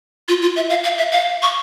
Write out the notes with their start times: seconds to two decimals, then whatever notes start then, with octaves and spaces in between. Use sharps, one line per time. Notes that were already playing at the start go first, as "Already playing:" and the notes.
0.29 F4
0.42 F4
0.56 E5
0.70 F5
0.84 F5
0.98 E5
1.12 F5
1.42 C#6